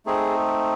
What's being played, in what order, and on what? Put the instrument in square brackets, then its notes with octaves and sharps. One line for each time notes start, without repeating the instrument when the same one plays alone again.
[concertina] A3 C4 D#4 G#4